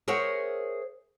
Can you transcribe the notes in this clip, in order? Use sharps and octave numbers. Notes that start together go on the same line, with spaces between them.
G#4 A#4 C5 C#5 E5 F#5